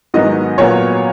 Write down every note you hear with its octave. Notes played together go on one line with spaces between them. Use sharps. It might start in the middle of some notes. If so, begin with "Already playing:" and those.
G#2 D#3 F#3 B3 D#5
A#2 F#3 B3 C#5